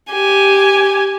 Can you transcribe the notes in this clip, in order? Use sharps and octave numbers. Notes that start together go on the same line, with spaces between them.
G4 G#5